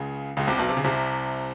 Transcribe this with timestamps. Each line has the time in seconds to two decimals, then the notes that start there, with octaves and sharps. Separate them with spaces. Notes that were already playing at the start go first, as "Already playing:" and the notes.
Already playing: C#2 C#3
0.37 C#2 C#3
0.47 C2 C3
0.58 B1 B2
0.69 C3
0.77 C#3
0.84 C2 C3